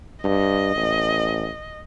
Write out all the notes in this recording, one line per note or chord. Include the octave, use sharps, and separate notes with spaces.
G2 D#5
A1